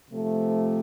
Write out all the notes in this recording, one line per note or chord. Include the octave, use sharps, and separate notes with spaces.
C3 F3 A3